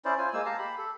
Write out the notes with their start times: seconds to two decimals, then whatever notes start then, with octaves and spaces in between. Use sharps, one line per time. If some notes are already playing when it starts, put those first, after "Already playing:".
0.05 C#4 E4 C5 D5
0.18 F4 C5 G#5
0.33 G#3 A#3 G#5 E6
0.46 G4 F5 A5 A#5
0.58 G4 B5
0.78 A4